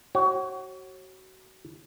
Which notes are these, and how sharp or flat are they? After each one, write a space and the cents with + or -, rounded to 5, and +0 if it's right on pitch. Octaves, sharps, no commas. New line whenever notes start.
F#4 +30 C#5 -35